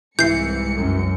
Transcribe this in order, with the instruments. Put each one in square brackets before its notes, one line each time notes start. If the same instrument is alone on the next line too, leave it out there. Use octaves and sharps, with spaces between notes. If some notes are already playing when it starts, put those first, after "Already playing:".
[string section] C2 G#2 C#7 [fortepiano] E3 E4 [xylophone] G6 C7
[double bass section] F#2